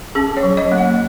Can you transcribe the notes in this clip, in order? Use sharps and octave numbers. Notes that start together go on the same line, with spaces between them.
C#4 G#4
C#5
F#3
D#5
A#3
F#5